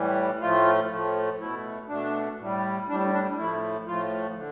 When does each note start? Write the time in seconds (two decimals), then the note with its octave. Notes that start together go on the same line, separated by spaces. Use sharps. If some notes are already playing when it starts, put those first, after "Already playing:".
Already playing: A2 E3 G3
0.40 A2 F3 A3 F4
0.90 A2 F3 A3
1.40 B2 A3 E4
1.88 B2 A3 D4
2.38 A2 G3
2.88 A2 G3 D4
3.13 D4
3.37 A2 F3 A3 E4
3.87 A2 F3 A3 F4
4.36 D3